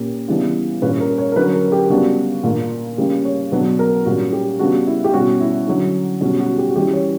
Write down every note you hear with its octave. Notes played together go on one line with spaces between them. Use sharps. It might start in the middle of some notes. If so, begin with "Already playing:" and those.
Already playing: A#2 A#3 C#4 G4
C#3 E3 G3 B3 D4
A#2 G3 C#4 B4
A#4
C#5
A#4
D3 F#3 C#4 B4
A#4
A#4
G4
C#3 G3 B3 D4 F#4
A#2 A#3 D4
C#3 G3 A#3 C#4 G4
C#5
B2 F#3 B3 D4 B4
A#4
A#2 G3 C#4 F#4
G4
C#3 G3 B3 D4 F#4
E4
G4
B2 G3 C#4 F#4
E4
D3 F#3 C#4
B2 G3 C#4 F#4
F#4
G4
F#4
E3 G3 C#4 G4
C#5